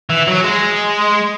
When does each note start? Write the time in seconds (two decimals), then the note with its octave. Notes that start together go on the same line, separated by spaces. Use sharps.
0.10 E3
0.28 F#3
0.44 G#3